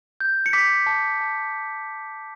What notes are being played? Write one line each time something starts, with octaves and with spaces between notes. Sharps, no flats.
G6
C#7
D6 B6
A5
A5